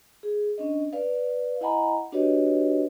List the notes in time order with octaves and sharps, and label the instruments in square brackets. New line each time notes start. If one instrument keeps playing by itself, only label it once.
[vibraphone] G#4
C#4 D4 D#5
B4 D5 F5
E4 D#5 F#5 G#5 A#5 B5
D4 F#4 G4 B4 C#5 D#5